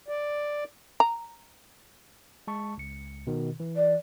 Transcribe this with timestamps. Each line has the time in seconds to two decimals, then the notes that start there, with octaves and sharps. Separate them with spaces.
0.08 D5
1.00 A#5
2.47 G#3 A5 C#6
2.78 C#2 C#7
3.27 B2 D#3
3.60 E3
3.76 D5